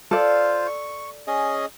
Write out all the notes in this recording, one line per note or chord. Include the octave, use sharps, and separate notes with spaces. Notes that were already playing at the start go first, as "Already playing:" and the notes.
F4 A4 C5 D5 F5
C#6
C#4 G#4 D#5